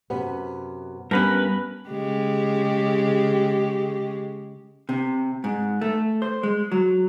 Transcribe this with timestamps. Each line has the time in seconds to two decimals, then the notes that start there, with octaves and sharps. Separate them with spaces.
0.10 F#2 C3 B3
1.11 G2 B3 C#4 A#4 B4
1.89 C#3 G#3 G4
4.89 C3
5.44 G#2
5.81 A3
6.22 C5
6.43 G#3
6.72 F#3